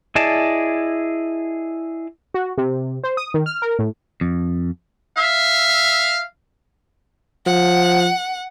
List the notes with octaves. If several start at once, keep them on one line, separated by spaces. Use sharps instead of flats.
E4 G#4 D5 D#5 A5
F#4
C3
C5
D#6
D#3
F6
A#4
A2
F2
E5 F5
F3 F#5